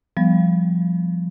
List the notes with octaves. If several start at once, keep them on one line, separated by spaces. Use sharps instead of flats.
F3 G3 B3